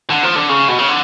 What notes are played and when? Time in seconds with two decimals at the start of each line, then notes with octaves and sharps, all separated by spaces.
0.10 D3
0.23 F3
0.36 D3
0.49 C#3
0.68 B2
0.79 C#3
0.88 D3